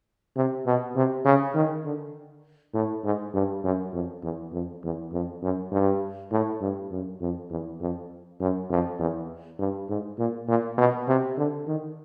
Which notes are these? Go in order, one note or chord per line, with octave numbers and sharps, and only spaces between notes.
C3
B2
C3
C#3
D#3
D3
A2
G#2
G2
F#2
F2
E2
F2
E2
F2
F#2
G2
A2
G2
F#2
F2
E2
F2
F#2
F2
E2
G2
G#2
A#2
A#2
B2
C3
D3
D#3